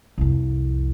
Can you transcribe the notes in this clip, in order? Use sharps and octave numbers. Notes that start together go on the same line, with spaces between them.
C2 F2